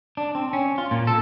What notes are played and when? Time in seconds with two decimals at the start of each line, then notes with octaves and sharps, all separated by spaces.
0.17 D4
0.35 C4
0.53 C#4
0.78 F4
0.91 A#2
1.07 A4